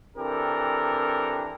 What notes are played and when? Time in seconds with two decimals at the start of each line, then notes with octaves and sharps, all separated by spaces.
0.17 E3 C4 D4 G4 A4 A#4